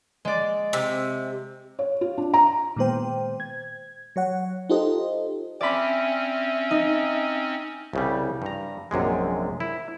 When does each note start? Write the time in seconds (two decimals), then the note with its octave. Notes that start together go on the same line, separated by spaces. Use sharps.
0.25 G#3 D5
0.73 C3
1.79 C#5
2.01 F4
2.18 D4
2.34 A#5
2.76 A#2 D#3 G#3 B3 C5 G5
3.40 G#6
4.16 F#3 C#5 F#5
4.69 D#4 F4 G4 A4 C5 D#5
5.61 C4 C#4 D5 E5 B5
6.71 D#4
7.93 C2 C#3 G3
8.42 G2 A#5
8.91 A#1 F#2 C3 G#3
9.60 E4